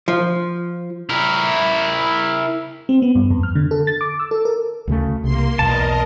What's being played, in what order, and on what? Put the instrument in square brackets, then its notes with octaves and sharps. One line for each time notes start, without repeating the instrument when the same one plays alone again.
[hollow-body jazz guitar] F3
[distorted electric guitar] E4 A#4
[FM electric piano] C4
B3
G2
F2
F6
D3
A4
A6
D6
E6
A4
A#4
[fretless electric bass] D2 C#3 A3
[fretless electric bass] C2 [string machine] A#3 C6
[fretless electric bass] B1 E2 [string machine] A#4 D#5 [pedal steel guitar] A5